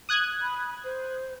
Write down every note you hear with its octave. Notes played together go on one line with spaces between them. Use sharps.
D#6 F#6 G#6
B5
C5